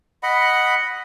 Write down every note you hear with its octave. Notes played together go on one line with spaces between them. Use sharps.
D#5 F#5 B5